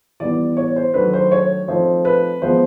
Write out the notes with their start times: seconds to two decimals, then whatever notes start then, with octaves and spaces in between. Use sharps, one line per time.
0.20 E3 G3 B3 D5
0.57 C#5
0.76 C5
0.94 D#3 F#3 A3 D4 B4
1.13 C5
1.31 C#5
1.68 F3 A3 C4 D#4 C5
2.05 B4
2.42 F3 G#3 B3 C5